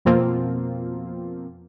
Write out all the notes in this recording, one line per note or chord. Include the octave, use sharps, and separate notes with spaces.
F2 B2 F3 A#3 C4 F4